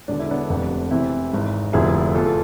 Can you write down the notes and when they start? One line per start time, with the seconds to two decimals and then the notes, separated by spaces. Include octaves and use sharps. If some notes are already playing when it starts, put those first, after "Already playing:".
0.08 E1 E2 D3 D4
0.19 E4
0.31 B3 D4
0.49 F1 F2 C3
0.91 E2 C3 E3 C4 E4
1.32 G#1 G#2 E3
1.73 F1 E2 D3 F3 E4 G#4
2.14 E2 B2 F4 A4
2.25 A4